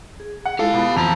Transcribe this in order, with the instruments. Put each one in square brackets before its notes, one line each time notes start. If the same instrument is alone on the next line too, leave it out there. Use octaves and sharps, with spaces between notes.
[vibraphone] G#4
[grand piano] F#5
[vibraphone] G#3 E4 F4 [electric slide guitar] G4 F5 [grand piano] A4
[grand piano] B2 [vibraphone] B5
[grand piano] F2 A#5 F7 [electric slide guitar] E3 A5